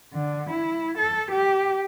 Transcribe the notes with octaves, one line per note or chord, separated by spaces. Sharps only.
D3
E4
A4
G4